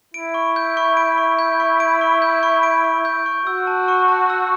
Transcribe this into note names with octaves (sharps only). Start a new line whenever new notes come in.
E4 D7
C#6
G6
C#6
D7
C#6
G6
C#6
D7
C#6
G6
C#6
D7
C#6
G6
C#6
F#4 E6
A5
C#6
A5
E6